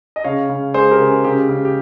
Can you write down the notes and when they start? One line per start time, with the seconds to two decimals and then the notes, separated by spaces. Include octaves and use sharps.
0.16 D#5
0.24 C#3 C#5 F5
0.49 C#3
0.74 G#3 G#4 C5
0.91 G4 A#4
1.00 C#3
1.08 G#4
1.24 C#3 G4
1.49 C#3
1.65 G4